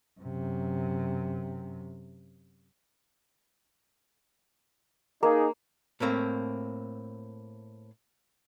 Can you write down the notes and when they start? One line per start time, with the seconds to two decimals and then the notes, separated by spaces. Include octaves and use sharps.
0.20 F#2 C3
5.23 A#3 D#4 G#4
6.00 A2 A3 A#3 C4